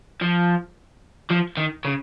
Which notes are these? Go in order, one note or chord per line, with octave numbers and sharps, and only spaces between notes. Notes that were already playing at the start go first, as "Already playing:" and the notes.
F3
F3
D#3
C#3